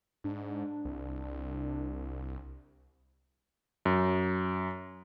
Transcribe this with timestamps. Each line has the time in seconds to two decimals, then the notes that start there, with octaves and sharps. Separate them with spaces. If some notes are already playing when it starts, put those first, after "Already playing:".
0.24 G#2 D4
0.85 C2
3.85 F#2